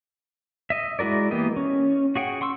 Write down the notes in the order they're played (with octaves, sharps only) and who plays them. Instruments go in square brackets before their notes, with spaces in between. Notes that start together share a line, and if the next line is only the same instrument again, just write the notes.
[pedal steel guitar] D#5 E5
G#3 E4 F#4 A#4 D5
E3 A#3 B3 G4 D#5
C#4
F#4 G#4 F#5 G5
F#5 C6 C#6 E6